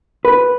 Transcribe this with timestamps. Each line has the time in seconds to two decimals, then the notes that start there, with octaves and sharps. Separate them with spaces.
0.25 B4